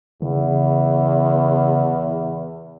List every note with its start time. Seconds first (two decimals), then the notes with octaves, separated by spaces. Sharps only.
0.22 E2 C#3